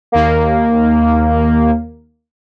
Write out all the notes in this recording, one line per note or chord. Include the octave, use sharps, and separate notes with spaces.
D#2 A#3